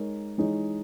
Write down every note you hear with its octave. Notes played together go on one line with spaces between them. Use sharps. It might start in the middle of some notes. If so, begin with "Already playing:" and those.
Already playing: G#3 D#4 A#4 C#5
E3 G#3 D#4 G#4 C#5